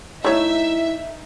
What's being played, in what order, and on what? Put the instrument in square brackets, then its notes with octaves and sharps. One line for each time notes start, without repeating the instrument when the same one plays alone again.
[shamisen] A3 C#5 [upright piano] D#4 [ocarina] E4 [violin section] E5